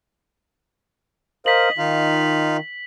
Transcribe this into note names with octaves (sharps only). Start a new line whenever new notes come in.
A#4 C5 D#5 F5 B6 F#7
D#3 D#4 F4 F5